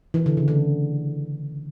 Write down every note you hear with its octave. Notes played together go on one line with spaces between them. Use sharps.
E3
D3
C#3
D3